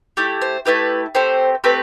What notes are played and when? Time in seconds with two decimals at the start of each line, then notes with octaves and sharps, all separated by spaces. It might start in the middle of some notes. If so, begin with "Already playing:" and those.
0.17 A3 E4 G4
0.42 C5
0.65 A3 E4 G4 B4
1.15 A3 C4 G4 C5
1.64 A3 C4 G4 B4